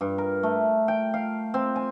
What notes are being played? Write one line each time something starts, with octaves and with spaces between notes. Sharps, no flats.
G2
A#4
A3
G5
F5
C4
G#5